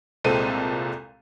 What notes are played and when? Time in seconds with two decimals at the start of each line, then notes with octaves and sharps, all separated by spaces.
0.24 C2 A#2 G#3 C4 A4 D#7